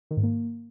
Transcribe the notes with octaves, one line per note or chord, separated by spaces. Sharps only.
D#3
G#2
A#3